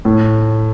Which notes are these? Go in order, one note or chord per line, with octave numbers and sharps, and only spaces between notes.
A2